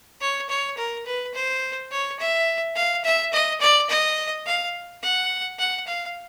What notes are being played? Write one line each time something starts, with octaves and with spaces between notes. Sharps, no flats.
C#5
C#5
A#4
B4
C5
C#5
E5
F5
E5
D#5
D5
D#5
F5
F#5
F#5
F5